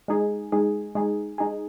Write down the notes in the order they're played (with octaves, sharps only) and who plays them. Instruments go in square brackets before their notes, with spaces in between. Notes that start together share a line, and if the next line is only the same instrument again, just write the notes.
[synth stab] G#3 D#4 G#4
G#3 D#4 G#4
G#3 D#4 G#4
G#3 D#4 G#4